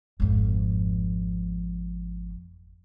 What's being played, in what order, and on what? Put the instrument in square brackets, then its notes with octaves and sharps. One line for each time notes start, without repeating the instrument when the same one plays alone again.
[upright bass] G#1 F2